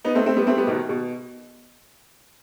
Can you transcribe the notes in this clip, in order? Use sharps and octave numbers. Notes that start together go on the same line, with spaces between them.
B3 D#4
A3 C4
A3 C4
G3 B3
A3 C4
G3 B3
B2 D#3
B2